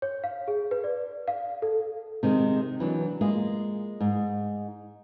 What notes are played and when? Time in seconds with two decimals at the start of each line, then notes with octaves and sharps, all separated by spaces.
0.02 C#5
0.24 F5
0.48 G#4
0.71 B4
0.84 D5
1.28 F5
1.62 A4
2.23 C3 D#3 G#3
2.80 E3 F#3 D4
3.21 G#3 A#3 F4 G#4
4.01 G#2